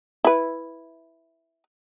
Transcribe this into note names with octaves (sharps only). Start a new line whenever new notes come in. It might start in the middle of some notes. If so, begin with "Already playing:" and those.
E4 B4